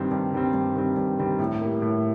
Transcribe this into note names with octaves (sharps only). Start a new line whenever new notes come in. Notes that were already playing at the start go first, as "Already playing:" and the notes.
Already playing: G2 D#3 G3 C4
G2
D#3 G3 C4
G2
D#3 G3 C4
G2
D#3 G3 C4
A2
G3 A#3
A2